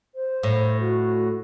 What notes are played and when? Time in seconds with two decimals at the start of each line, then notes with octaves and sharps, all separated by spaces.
0.14 C5
0.43 A2
0.80 F#4